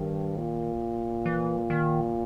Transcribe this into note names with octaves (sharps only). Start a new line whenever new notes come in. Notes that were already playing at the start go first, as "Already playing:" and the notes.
Already playing: G2 D#3
A#2
E3
D#3